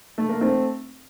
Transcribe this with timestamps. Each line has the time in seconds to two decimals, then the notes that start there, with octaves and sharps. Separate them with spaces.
0.18 A3
0.29 A#3
0.41 A3 C4